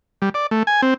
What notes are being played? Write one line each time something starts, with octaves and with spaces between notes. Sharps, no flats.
G3
D5
A3
G#5
C4